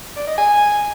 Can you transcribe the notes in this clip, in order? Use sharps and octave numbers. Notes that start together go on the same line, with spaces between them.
D5
D#5
G#5